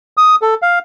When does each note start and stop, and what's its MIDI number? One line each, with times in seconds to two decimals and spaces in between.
0.17 0.36 87
0.42 0.54 69
0.62 0.79 77